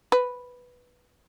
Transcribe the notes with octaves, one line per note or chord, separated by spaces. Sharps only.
B4